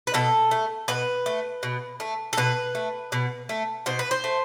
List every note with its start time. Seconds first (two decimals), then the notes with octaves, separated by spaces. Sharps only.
0.07 B4
0.14 B2 A4
0.51 A3
0.88 B2 B4
1.26 A3
1.63 B2
2.00 A3
2.33 A4
2.37 B2 B4
2.75 A3
3.12 B2
3.49 A3
3.86 B2 C5
3.99 B4
4.11 C5
4.24 A3